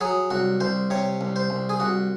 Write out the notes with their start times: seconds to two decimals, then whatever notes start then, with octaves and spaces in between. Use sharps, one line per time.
0.01 F#3 G#4
0.31 C2 F#4
0.60 C2 C5
0.90 C3 C#5
1.21 C2
1.36 C5
1.50 C2
1.69 G#4
1.80 C2 F#4